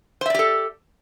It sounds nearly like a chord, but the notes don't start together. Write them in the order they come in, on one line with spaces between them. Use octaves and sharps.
C5 E5 D5 G4 A4